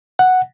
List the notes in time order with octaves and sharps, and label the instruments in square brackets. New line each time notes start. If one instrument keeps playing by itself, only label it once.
[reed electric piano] F#5